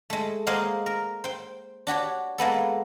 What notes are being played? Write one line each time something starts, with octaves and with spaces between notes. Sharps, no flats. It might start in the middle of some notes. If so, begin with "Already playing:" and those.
G#3 A3
G#3 A#3 C5 D#5 F5 F#5
A#4
C5 G5
D4 F#4 G4 C#5
G#3 A#3 B3 A4